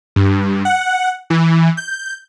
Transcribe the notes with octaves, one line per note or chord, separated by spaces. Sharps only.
G2
F#5
E3
G6